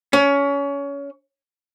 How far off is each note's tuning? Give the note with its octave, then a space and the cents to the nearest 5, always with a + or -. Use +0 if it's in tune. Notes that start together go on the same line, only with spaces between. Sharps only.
C#4 +25